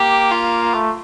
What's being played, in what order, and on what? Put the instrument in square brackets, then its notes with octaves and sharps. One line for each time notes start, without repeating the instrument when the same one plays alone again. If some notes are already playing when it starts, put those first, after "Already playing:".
Already playing: [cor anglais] A#3 [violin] G4
[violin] F4
[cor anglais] A3